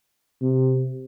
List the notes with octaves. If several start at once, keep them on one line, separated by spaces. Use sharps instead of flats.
C3